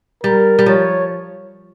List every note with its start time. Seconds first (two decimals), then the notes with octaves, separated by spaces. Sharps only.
0.24 G3 A#4
0.59 G3
0.66 F3 C#5